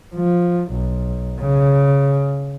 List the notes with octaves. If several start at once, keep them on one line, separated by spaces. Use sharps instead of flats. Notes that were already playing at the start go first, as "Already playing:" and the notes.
F3
B1
C#3